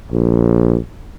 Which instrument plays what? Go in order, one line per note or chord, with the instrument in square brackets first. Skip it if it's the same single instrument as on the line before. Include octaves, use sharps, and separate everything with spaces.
[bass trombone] A#1